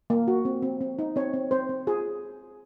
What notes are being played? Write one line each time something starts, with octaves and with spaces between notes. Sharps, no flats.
A#3
F#4
C4
C4
C4
D#4
C4 C#5
C4
C4 C5
C4
F4 G#4